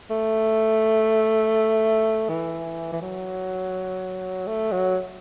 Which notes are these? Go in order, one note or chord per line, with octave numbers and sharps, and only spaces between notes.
A3
E3
E3
F#3
A3
F#3